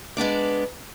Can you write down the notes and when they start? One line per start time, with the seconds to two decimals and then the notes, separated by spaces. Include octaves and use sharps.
0.17 G#3 B3 D4 D5